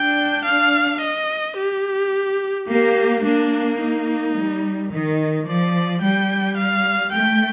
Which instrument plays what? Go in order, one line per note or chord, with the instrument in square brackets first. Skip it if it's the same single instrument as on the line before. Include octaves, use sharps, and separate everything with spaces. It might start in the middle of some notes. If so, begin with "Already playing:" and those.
Already playing: [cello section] D4 [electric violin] G5
[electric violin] F5
D#5
G4
[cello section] A#3 [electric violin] G4
[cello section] A#3 [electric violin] D4
[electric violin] D#4
[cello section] G3
D#3
[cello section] F3 [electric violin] D5
[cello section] G3 [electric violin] G5
[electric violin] F5
[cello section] A3 [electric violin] G5